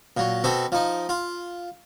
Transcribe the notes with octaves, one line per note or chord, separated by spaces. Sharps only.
A#2 F#3
B2 C4 A4
F3 D#4
F4